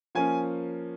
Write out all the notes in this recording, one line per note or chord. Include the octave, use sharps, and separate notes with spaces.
F3 A#3 C#4 G#5